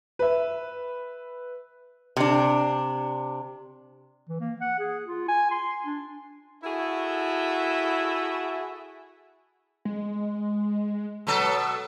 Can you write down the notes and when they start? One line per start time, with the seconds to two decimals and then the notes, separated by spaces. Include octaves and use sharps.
0.19 B4 E5
2.17 C3 D4
4.29 E3
4.40 A#3
4.61 F#5
4.79 G#4
5.06 F4
5.28 G#5
5.51 C6
5.86 D4
6.63 E4 F#4 G#4 A4 E5
9.85 G#3
11.27 B2 F#3 A4